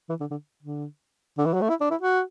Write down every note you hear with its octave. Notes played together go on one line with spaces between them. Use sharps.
E3
D3
D3
D3
D3
E3
F#3
A3
E4
D4
E4
F#4